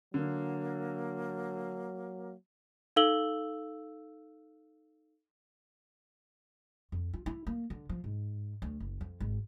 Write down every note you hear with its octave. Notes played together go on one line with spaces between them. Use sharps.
D3 F#3 A#3
D#4 A4 F5 E6 F#7 G7
F2
F4
E4
A#3
D3
F3
G#2
D2
F#1
F2
G#1